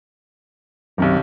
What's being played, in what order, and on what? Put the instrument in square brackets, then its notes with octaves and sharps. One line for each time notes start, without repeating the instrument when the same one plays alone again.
[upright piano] B1 C3 D#3 [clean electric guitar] F#2